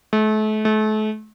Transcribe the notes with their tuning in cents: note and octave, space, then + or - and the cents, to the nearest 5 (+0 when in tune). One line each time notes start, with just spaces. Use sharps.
A3 -35
A3 -35